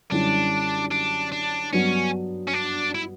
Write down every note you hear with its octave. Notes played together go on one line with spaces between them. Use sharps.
F#2 D3 G3 C#4 D4 E4
D4
D4
G2 F#3 B3 C#4 D4
C#4
D4
E4